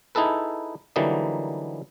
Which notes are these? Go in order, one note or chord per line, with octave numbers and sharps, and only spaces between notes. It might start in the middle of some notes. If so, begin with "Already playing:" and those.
D#4 E4 G#4 A4 B4
D3 E3 F#3 G3 A#3 D#4